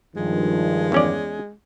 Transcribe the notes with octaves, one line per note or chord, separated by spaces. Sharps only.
G2 D#3 F3 G#3
E2 C#4 D5